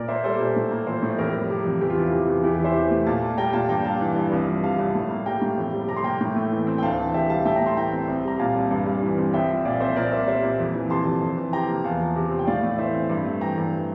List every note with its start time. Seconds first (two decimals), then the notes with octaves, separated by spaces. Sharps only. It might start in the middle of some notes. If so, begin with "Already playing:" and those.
Already playing: A#2 A#4 D5
0.08 A#3 C5 E5
0.24 G3 A4 C5
0.40 A#2
0.56 A2
0.71 A#3
0.86 F3 A4 C5
1.03 A2
1.18 F2 G4 A#4
1.34 G3
1.50 C3
1.65 F2
1.81 E2 G4
1.90 F4
1.96 E3 E4
2.07 F4
2.12 C3
2.28 E2
2.44 E2 E4 G4
2.54 E4 G4
2.59 E3
2.64 C5 E5
2.75 C3
2.91 A3
3.06 A#2 F5 A5
3.22 A#3
3.38 G3 G5 A#5
3.53 A#2 F5 A5
3.69 G2 G5 A#5
3.84 G3 F5 A5
4.01 E3
4.16 G2
4.32 C2
4.47 F3
4.63 C3 F5 A5
4.79 C2
4.95 A2
5.10 A#3
5.26 G3 G5 A#5
5.41 A2
5.58 F2
5.73 G3
5.89 C3 A#5
5.96 C6
6.04 A#3 G5 A#5
6.21 A2
6.36 A3
6.51 E3
6.67 C4
6.78 G5
6.82 D2 F5 A5
6.99 E3
7.14 C3 E5 G5
7.29 G3 F5 A5
7.45 A2 E5 G5
7.56 G5 A#5
7.61 A3
7.66 A5 C6
7.77 E3 G5 A#5
7.92 C4
8.08 C2
8.24 G3 A#5
8.39 A#2 F5 A5
8.55 C2
8.71 G2
8.87 G3
9.02 E3
9.18 C4
9.34 C2 E5 G5
9.49 F3
9.65 A#2 D5 F5
9.80 C2 C5 E5
9.96 A#2 A#4 D5
10.12 C4 C5 E5
10.27 G3 C5 E5
10.43 A#2
10.59 F2
10.75 E3
10.90 C3 A5 C6
11.06 F2
11.22 F2
11.37 E3
11.53 C3 G5 A#5
11.69 A#3
11.84 E2 F5 A5
12.00 F3
12.16 C3
12.31 C4
12.39 G5
12.47 A2 D5 F5
12.63 A3
12.78 E3 C5 E5
12.95 C4
13.10 G2
13.25 A3
13.41 E3 G5 A#5
13.58 G2